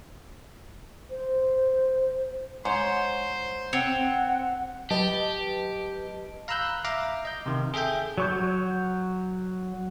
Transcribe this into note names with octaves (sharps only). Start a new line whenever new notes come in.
C5
G#2 C5 C#5
C4 C#5 F#5
F#3 G4 B4 D#5 A5
F5 A#5 B5 E6 F#6 G6
E5 F5 A#5 D6
D#5 G6
C3 D#3
G#4 A4 E5 G5 G6
F#3 C#6 G6